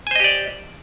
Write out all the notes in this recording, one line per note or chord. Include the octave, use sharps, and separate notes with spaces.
G4 C5 D5 D#5 G#5